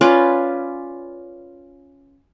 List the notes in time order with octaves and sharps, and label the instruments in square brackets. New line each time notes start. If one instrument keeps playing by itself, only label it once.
[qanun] C#4 F4 B4 D5